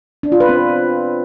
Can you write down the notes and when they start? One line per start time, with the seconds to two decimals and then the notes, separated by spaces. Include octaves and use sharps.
0.23 D4
0.32 F4
0.40 B4
0.49 C4